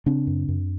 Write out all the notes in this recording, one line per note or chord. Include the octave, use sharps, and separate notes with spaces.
C#3 C4 D4
F#2
F#2